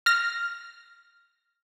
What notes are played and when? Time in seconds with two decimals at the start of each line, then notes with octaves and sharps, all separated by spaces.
0.06 F6 A#6